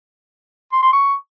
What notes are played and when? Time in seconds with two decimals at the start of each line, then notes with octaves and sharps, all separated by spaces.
0.72 C6
0.83 C6
0.93 C#6